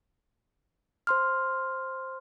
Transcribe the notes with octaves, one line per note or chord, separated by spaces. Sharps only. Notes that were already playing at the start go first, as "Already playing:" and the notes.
C5 C6 F6